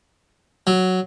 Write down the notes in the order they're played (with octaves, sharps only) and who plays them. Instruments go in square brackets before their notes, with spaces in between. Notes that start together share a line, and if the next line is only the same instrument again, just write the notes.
[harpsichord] F#3